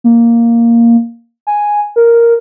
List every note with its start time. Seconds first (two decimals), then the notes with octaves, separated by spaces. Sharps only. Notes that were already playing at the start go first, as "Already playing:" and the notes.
0.04 A#3
1.47 G#5
1.96 A#4